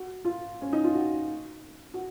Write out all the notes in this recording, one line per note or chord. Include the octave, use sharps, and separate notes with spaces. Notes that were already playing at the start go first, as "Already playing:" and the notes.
Already playing: F#4
F4
C#4
D#4
F4
F#4
F#4